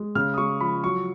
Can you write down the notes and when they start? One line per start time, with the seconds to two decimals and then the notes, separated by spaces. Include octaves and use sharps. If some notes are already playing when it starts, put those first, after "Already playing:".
Already playing: G#3
0.15 C#3 F6
0.34 D#6
0.38 G#3 C#6
0.61 F3 B5
0.83 F#3 C#6